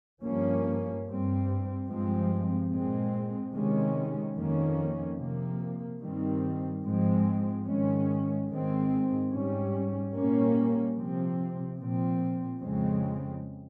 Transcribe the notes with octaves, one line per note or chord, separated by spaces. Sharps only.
G2 F3 A#3 C#4
G2 G3 C4
G2 F3 G#3 C4
A#2 G#3 C4
C3 D#3 G#3 C#4
F2 D#3 A#3 C#4
C3 F3 A#3
G2 D#3 G3 C4
G#2 F3 G#3 C4
G#2 D#3 G#3 C#4
G#2 D#3 G#3 C4
G#2 G3 C#4
A#2 G3 A#3 C#4
C3 F3 C4
A#2 F3 C4
F2 C#3 G#3 C4